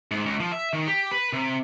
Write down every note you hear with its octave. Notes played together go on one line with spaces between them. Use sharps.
G#2
C#2
F3
E5
D#3
G4
B4
C3